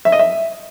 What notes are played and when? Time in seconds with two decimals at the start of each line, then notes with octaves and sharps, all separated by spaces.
0.05 E5
0.12 D#5
0.19 E5